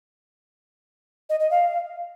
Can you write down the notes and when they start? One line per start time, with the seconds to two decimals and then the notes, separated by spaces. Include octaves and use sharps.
1.30 D#5
1.40 D#5
1.51 F5